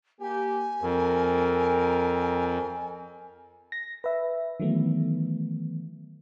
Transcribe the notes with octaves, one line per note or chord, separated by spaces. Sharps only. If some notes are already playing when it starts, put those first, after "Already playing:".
A#3 G4 G#5
F2 A#4
A#6
B4 E5
D#3 E3 F#3 A3 B3